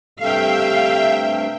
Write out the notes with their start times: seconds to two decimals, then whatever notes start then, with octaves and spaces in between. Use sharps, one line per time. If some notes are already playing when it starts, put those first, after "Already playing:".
0.19 G2 C3 A3 E5 F5 G5